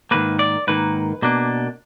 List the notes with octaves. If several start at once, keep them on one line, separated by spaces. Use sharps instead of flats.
G#2 D#3 A#3 B4
D5
G#2 D#3 A#3 B4
B2 A#3 D4